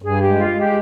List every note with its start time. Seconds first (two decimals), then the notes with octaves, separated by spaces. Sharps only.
0.02 G2 G#4
0.20 G4
0.26 G#3
0.33 E4
0.38 F4
0.50 G#3
0.57 G4